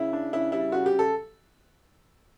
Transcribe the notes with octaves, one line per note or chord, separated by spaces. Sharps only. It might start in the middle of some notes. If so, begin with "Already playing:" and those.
Already playing: C#3 E4
D4
C#3 E4
G3 E4
C#3 F#4
G4
C#3
A4